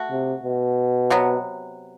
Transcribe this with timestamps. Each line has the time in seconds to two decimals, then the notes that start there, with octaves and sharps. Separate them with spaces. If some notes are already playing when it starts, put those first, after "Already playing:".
Already playing: A3 F#4
0.10 C3
0.44 B2
1.10 C3 F#3 B3